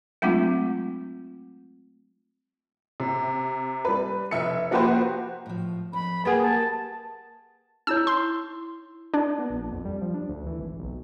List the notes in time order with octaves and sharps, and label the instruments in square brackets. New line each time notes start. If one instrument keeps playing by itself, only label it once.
[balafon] F#3 G#3 A3 C4 D4 F4
[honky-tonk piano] C3
G3 B4
F1 E5 C#7
F3 A#3 F#4 G4 B4 C5
[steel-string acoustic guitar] A2 F3
[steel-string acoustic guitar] F2 [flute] B5
[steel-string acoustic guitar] A#3 G4 A#4 [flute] G#4 [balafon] B4 F#5 G#5
[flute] A5
[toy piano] D#4 E4 C#5 [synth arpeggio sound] E6
[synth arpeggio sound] C6
[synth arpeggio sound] D4 [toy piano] D#4
[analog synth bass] B3
A#1
F2
G3
F3
D4
D2
E3
G#1
B1